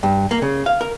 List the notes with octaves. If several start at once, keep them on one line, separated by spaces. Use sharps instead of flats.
G2
A#3
C#3
F5
A#4